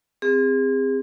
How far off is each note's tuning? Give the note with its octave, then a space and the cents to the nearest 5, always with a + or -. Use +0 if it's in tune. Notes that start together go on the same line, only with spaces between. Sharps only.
C4 +0 G#4 -35